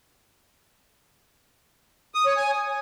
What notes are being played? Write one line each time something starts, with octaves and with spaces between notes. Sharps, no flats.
D#6
C#5
G#5